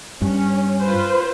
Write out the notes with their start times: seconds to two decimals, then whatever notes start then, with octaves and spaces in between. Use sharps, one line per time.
0.22 G2 C#4
0.81 F4 B4 C5